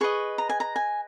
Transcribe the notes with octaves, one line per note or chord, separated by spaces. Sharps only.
G#4 B4 D#5 C#6
A#5
G#5
A#5
G#5